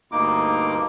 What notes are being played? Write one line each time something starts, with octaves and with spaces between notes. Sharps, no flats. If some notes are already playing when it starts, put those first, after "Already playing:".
D2 G2 A#3 D#4 D6